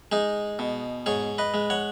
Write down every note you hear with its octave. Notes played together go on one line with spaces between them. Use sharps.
G#3 D#4 G#4
B2
G#2 G#4 C#5
B4 D#5
G#3
C#5 F#5